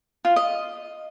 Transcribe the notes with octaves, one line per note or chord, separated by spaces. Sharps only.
F4
D#5